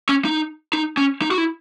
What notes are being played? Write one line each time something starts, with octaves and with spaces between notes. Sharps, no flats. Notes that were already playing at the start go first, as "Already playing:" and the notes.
C#4
D#4
D#4
C#4
D#4
F#4
E4